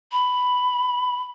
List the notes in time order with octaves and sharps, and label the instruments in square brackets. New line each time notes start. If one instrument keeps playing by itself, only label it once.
[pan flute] B5